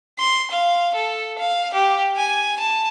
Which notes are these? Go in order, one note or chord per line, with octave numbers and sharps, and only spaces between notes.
C6
F5
A4
F5
G4
G#5
A5